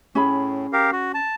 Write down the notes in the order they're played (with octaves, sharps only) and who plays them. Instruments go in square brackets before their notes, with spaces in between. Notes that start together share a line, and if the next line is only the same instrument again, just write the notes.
[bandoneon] A2 [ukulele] C#4 G#4 B5
[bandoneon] G4 A#4 F5
F#4
A5